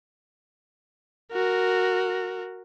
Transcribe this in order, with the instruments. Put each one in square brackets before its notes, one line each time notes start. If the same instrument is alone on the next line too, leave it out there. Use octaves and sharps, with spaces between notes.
[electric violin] F#4 A#4